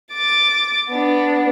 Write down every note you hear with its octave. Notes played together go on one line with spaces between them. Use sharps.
D6 A6
B3 D4